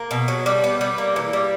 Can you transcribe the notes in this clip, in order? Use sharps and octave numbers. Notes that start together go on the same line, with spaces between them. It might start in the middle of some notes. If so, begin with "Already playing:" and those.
Already playing: A#3
B2
F#3
G3
B3
G3
A#3
E3
G3